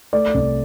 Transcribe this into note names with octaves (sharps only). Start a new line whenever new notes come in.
A3 D5
C2